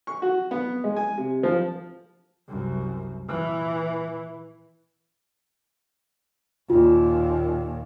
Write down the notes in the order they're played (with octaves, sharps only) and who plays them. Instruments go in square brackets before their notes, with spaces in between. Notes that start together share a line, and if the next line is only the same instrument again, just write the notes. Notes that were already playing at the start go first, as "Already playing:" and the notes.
[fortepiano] C#6
F#4
B3
G#3
G#5
C3
F3
[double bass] C2 F#2
A#2 E3
[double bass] D#2 A#2 [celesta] F4